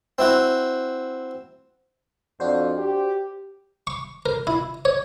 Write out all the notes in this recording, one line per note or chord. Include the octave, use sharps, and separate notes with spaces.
C4 E4 F#4
F2 D4 F#4 C5
G4
C#6
A#4
E4
C#5